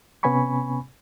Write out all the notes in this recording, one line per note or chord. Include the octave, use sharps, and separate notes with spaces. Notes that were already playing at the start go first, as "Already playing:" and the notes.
C3 B3 C#4 G#5 B5 C#6